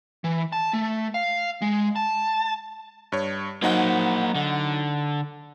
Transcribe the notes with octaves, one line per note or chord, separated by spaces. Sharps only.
E3
A5
A3
F5
G#3
A5
G2 C#5
F#3 A#3 D#4 C5 F#5
D3